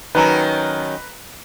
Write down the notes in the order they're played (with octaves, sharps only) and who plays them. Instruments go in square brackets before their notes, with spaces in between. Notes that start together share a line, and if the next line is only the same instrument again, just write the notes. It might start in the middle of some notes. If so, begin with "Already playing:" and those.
[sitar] D#3 F#3 C#4 [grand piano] B4 A#5